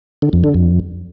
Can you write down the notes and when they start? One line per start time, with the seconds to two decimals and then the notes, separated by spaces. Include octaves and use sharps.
0.22 D3
0.33 F2
0.44 D3
0.54 F2